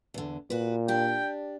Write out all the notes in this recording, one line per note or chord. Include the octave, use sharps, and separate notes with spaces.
E2 D3
A#2 F#4 B4
D4 G4 G5